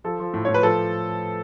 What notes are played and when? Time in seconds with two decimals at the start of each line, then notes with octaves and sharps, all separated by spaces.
0.04 F3 A4
0.20 F3
0.34 A2
0.45 A2 C#5
0.54 B4
0.63 F3 A4